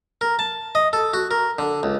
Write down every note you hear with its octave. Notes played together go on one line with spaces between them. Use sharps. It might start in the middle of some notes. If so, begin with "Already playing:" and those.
A#4
A5
D#5
A4
F#4
A#4
D3
C#2